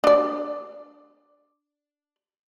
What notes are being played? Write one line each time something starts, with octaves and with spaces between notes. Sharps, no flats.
D4 D5